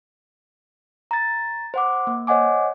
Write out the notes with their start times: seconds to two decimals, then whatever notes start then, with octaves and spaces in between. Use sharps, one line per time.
1.11 A#5 A6
1.74 C5 F#5 D6
2.07 A#3
2.27 C5 C#5 D#5 F#5 G#5 D6